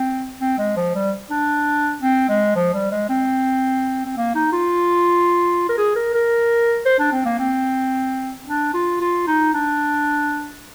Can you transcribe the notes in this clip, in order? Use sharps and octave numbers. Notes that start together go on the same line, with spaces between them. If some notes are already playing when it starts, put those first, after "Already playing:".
Already playing: C4
C4
G#3
F3
G3
D4
C4
G#3
F3
G3
G#3
C4
C4
A#3
D#4
F4
A#4
G#4
A#4
A#4
C5
D4
C4
A#3
C4
D4
F4
F4
D#4
D4